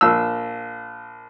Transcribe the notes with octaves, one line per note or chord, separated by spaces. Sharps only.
A#1 E6